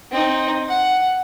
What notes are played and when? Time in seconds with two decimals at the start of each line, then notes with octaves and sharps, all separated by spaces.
0.12 C4 D#4
0.68 F#5